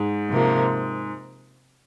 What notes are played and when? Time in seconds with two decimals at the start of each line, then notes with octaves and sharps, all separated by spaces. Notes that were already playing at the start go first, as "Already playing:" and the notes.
Already playing: G#2
0.29 C3 F3 A#3